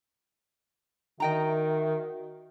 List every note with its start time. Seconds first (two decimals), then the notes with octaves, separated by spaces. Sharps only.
1.20 D#3 F#4 D#5 E5 G5 A#5